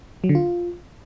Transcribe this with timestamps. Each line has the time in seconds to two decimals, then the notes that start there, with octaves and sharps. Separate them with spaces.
0.24 F#3
0.29 D3
0.35 F4